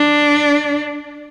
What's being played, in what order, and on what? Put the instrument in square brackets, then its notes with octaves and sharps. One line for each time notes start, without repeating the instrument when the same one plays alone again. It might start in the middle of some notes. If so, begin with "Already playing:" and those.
Already playing: [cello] D4